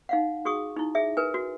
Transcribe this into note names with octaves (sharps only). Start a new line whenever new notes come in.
D#4 F5 F#5
F#4 G#4 C#6 D#6
D#4 E4
G#4 E5
A#4 B4 G#5
F#4